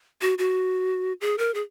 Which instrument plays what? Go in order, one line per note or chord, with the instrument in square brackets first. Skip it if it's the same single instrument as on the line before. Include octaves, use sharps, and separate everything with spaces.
[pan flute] F#4
F#4
G#4
A#4
G#4